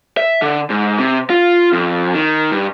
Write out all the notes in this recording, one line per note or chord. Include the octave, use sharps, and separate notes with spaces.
E5
D3
G#2
C3
F4
F2
D#3
G2